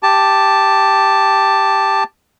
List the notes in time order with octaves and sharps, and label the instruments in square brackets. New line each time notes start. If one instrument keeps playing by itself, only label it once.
[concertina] G4 A5